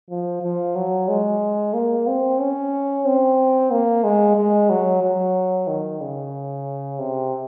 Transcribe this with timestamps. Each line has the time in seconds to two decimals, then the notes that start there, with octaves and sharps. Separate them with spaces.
0.10 F3
0.42 F3
0.75 F#3
1.08 G#3
1.74 A#3
2.07 C4
2.39 C#4
3.06 C4
3.71 A#3
4.04 G#3
4.36 G#3
4.70 F#3
5.02 F#3
5.68 D#3
6.01 C#3
6.99 C3